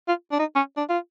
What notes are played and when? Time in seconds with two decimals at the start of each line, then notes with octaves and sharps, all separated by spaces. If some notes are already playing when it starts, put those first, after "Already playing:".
0.08 F4
0.32 D4
0.39 D#4
0.55 C#4
0.77 D4
0.89 F4